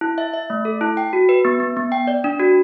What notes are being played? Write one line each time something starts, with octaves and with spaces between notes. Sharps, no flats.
E4
E5
E5
A3
A4
E4
G5
F#4
B4
B3
B3
B3
G5
D5
D4
F#4